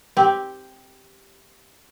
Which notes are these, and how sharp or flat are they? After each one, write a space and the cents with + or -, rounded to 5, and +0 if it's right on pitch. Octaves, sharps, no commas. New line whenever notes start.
C4 +0 G4 +0